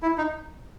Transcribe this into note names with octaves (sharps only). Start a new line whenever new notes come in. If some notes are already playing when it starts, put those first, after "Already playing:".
E4
D#4